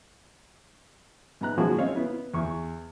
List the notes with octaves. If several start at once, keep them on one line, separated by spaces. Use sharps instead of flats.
G#2 B3 A#5 F#6
F3 F#3 G#3 A#3 C#4 F#4
C4 C#4 C#5 D#5 F5
B3 E4
E2 C#6